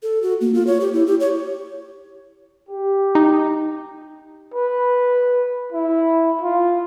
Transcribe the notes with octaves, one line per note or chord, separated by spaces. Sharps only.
A4
F#4
A#3
F4
C#5
G4
E4
G4
C#5
G4
D#4
B4
E4
F4